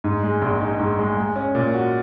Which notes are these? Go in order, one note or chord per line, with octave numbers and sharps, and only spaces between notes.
G#2
G#3
A#1
D#4
G#2
G#3
G#3
C#4
A#2
F#4